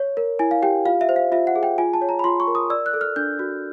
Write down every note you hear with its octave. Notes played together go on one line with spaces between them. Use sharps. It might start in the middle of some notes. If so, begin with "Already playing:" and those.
Already playing: C#5
A#4
E4 G#5
F5
G4 G5
F4 F5
E5
C5
F5
F4 E5
F#5
G#4
G5
F4 G#5
A5
C#5
A#5
B5
F4 C6
C#6
A#4
D#6
D5 E6
F#6
A4
F6
D4 G6
F#4